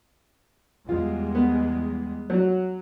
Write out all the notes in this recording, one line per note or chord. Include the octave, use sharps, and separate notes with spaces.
E2 G3 G#3 F4
B3
F#3 F#4